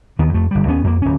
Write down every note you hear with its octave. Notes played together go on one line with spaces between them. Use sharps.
D#2 D#3 B3
F2 A3
G1 G3
D#2 B3 C#4
F2 A#3
D1 C#4